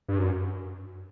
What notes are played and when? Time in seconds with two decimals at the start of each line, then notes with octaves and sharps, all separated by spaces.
0.08 G2
0.18 F#2